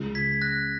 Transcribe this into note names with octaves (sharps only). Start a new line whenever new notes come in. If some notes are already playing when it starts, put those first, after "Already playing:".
Already playing: C#2 C#3 G#3
G#6 B6
F#6 A#6